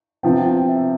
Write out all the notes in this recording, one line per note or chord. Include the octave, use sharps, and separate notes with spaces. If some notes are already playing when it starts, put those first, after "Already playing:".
C3 F3 B3 G5
G5
E5